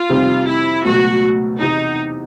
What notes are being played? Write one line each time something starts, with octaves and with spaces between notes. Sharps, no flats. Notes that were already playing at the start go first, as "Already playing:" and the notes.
Already playing: F4
F2 C3 D#3 G3 C4
E4
C#2 B2 F#3 A3 F#4
E2 C3 E3 D#4